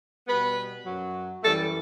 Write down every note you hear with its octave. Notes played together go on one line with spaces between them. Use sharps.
B2 G3 B3 B4
F#2 F#3
F#2 E3 G3 A3 A4